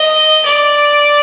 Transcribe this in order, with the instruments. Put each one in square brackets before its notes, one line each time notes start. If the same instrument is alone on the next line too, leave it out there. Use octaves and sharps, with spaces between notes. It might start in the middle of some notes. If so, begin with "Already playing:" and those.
Already playing: [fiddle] D#5
D5